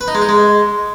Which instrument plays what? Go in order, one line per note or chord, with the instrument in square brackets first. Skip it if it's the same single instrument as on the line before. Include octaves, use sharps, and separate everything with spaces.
[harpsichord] B4
D#4
G#3
D#4
G#3